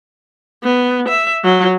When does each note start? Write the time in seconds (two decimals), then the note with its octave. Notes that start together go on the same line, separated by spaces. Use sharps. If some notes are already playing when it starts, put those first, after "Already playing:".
0.63 B3
1.08 E5
1.44 F#3